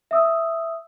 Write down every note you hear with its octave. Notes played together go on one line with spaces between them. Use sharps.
E5 D#6 E6